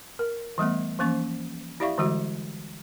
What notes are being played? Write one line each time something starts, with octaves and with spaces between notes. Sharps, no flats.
A#4
E3 G3 A3 B3
E3 F3 A#3 C#4 C#6
E4 G4 D5 E5 F5 C#6
D3 E3 G3 G#3 F#4